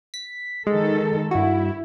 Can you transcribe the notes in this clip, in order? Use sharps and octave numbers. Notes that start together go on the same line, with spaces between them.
B6
D#3 G#3 A4
G2 E4 F#4